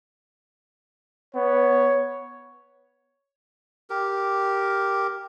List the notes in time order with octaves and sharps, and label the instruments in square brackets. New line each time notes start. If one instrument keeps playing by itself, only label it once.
[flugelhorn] B3 [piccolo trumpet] C#5
[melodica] G4 A#4